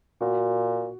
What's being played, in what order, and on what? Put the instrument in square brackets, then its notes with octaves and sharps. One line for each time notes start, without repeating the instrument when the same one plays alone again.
[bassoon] A#2 [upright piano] F#4